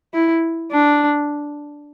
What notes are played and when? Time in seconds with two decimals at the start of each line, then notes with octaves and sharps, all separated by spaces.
0.14 E4
0.71 D4